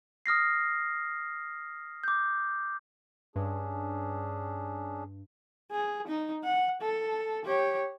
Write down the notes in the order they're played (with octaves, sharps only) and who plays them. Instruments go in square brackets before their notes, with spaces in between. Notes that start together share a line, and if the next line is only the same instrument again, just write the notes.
[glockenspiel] D#6 F6 A#6 C7
D6 G6
[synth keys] G2 [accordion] C#4 D4 G#4
[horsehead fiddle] G#4
D#4
F#5
A4
G4 C#5